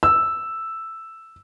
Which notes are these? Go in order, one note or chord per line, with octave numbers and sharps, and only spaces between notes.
E6